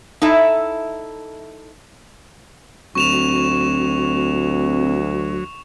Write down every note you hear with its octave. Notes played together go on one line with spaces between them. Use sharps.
D#4 E4 A4 E5
D2 F#3 C4 C#6 E7 F7